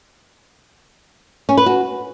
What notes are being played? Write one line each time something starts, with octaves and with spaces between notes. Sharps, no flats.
C#4
B4
F#4